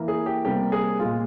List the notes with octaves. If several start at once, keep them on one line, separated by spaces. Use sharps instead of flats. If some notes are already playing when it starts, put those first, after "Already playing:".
Already playing: E3 A#3
G#4
G4
C3 G3 A#3 G4
G#4
A#2 G#3 F4